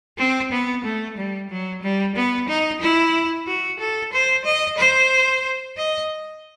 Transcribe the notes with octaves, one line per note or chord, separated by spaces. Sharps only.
C4
B3
A3
G3
F#3
G3
B3
D#4
E4
F#4
A4
C5
D#5
C5
D#5